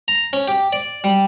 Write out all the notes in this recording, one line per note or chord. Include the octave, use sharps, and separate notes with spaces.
A#5
C#4
G4
D5
G3